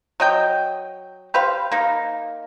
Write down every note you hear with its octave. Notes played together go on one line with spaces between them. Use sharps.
F#3 D#5 G5
G4 B4 C5 F5
A#3 D#4